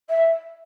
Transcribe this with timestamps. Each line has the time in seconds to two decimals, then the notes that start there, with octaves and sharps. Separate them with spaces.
0.09 E5